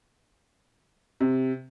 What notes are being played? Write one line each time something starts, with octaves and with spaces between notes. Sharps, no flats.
C3